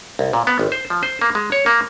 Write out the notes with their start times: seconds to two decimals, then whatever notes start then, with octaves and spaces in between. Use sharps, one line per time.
0.19 C2
0.33 A#2
0.47 B3
0.59 G#1
0.72 C5
0.90 F3
1.03 C5
1.22 A#3
1.35 G#3
1.52 C#5
1.66 A#3